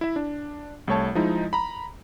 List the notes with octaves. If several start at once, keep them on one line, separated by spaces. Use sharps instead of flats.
E4 E5
D4
C2 A3 C#5 A5
F3 G#3 D#4 E4
A#5 B5